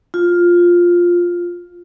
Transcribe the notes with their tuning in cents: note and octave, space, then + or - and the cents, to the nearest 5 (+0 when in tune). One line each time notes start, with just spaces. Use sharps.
F4 +5